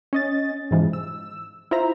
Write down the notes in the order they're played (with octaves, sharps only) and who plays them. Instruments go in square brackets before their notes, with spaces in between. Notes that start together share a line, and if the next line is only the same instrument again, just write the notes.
[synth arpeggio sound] C#4 D#5 A6
G#2 B2 E3 F3 G#3
E6
E4 F4 C5 E5 A#5